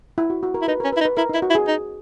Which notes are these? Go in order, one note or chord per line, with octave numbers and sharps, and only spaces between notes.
E4
F#4
F#4
A#4
E4
D#4 B4
A#4
C#4
B4
E4
D#4
B4
E4 A#4
D#4
E4
F#4
E4
G#4
D#4